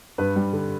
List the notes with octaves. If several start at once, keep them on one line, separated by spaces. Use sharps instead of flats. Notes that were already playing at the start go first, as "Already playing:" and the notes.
G2 B4
G3
D3